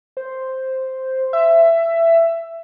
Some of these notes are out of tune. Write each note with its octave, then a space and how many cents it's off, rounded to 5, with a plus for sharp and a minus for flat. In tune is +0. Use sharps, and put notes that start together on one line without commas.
C5 +0
E5 +15